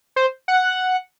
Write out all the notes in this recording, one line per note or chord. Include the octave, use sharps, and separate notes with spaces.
C5
F#5